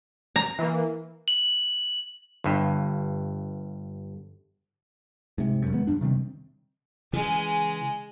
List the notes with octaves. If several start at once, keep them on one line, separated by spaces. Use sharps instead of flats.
A#5
E3 A#3
F#7
G1 G2
G#2 C3
F1 F#2
D#3 G#3 B3
F1 B1 G2 D4
C3 D#3 G3 C4
C#3 E3 G#3 G#4